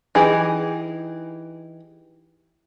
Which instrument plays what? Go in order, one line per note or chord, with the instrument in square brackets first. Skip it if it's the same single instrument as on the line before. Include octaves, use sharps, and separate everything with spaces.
[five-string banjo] E3 D#4 G4 G#4